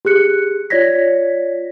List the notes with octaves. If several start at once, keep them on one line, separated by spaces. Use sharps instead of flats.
G4 G#4 F#6 C#7
F4 C#5 D5 G#6 A#6 B6